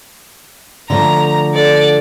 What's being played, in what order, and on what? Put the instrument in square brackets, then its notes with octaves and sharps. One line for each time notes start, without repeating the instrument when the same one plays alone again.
[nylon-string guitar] D3 F3 A3 [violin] A#5
[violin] A4 D5